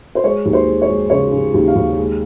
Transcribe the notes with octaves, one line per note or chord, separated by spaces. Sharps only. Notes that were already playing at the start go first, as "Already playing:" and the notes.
C5
G#3 C#5
D#2
C5
G#3
C#5
G#3
C#3 C#5
C#3
D#2
F5
D#2
G#3